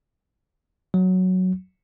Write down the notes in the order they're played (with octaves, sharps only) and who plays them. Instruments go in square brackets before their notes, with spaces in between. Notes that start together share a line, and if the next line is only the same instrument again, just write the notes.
[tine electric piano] F#3